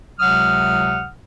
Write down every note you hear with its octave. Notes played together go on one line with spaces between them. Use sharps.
C#2 C3 F#3 F#5 D#6 F6